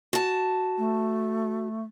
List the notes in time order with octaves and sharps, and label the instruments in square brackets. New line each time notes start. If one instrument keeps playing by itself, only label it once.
[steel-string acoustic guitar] F#4 A5
[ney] A3